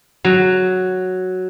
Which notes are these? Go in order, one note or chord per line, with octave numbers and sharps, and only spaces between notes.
F#3